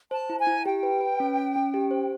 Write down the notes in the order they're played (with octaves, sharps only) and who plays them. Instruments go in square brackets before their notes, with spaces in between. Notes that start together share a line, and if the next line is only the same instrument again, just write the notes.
[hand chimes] C5 [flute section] A5
[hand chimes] E4
[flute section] G#5
[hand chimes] E4
[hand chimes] G4 [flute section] G5
[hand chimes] B4
B4
C#4
C#4
C#4
G4
C5